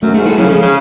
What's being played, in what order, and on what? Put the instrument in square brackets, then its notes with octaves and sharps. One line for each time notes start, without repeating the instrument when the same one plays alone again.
[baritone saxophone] F#2 [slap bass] A3
[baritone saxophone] G#2 [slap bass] A3
[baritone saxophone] A2 [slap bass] G#3
[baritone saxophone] C#3 [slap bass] F#3
[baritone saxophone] C#3 [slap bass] F3
[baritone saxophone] C#3